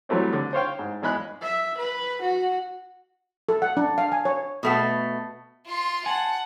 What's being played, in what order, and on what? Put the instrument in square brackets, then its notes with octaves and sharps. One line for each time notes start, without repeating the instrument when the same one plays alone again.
[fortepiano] E3 F#3 G3 A3 C4
D3
C5 C#5 F5 G5
G#2
E2 G#3 B5 F#6
[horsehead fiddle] E5
B4
F#4
[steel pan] A4
F#5
D4
F5
G#5
C#5
[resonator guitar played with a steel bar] B2 A3 B3
[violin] F4 C6
[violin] F#5 [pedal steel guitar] G#5 A5